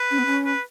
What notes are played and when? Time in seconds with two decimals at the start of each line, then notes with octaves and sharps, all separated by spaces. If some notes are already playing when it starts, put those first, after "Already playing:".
Already playing: B4
0.11 C#4
0.19 B3
0.26 C#4
0.45 B4